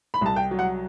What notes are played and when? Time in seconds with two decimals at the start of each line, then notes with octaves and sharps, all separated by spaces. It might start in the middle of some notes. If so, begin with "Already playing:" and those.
0.14 B5
0.21 C2 A5
0.36 G5
0.51 F#3
0.59 F#5